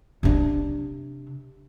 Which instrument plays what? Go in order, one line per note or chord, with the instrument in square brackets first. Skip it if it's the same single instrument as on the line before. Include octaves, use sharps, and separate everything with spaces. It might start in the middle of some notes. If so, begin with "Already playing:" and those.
[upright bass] C3 D4